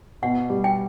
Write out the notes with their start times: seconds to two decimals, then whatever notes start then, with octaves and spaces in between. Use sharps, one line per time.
0.22 B2 F#5
0.50 G3
0.64 G5